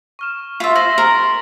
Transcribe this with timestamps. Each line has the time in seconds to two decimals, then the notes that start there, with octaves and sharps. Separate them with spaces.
0.19 C#6 F6 E7
0.60 F4 E5 C6 A6 B6
0.75 C5 A#6 F#7
0.98 A#4